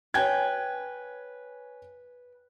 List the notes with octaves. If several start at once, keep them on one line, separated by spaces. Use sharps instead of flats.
B4 C#5 G5 G#5 G#6